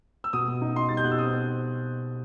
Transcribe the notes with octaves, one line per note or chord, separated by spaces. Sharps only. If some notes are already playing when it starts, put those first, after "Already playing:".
E6
B2 D#6
B2
D#4
D#4 C6
G3 A6
G6
B2 F#6
E6
C4 D#6
C4